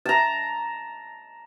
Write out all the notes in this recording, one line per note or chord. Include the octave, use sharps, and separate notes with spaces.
A5 A#5